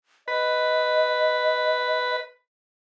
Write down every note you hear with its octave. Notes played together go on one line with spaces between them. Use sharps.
B4 D#5